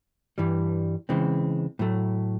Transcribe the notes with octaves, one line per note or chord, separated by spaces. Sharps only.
G2 E3 G3
C#3 E3 G#3 C4
A2 F#3 A3